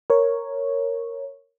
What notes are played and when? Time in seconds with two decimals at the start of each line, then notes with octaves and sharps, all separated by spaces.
0.10 A#4 C#5